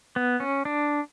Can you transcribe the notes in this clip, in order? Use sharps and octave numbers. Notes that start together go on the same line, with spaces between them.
B3
C#4
D4